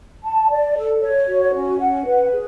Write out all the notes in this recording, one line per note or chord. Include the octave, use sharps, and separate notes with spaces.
A5
D5
A4
C#5
F#4
C#4
F#5
B4
G#4